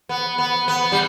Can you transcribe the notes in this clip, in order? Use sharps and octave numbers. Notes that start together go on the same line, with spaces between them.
B3
B3
B3
G3